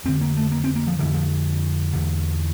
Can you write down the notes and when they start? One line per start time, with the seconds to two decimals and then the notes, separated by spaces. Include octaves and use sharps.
0.04 F2 D3 C4
0.21 A#3
0.36 A3
0.51 A#3
0.64 C4
0.75 A#3
0.87 F3
0.99 F2 D3 E3
1.14 F3
1.93 E2 D3